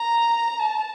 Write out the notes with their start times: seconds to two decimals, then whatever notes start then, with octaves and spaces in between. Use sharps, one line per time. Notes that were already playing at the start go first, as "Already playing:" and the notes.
Already playing: A#5
0.59 A5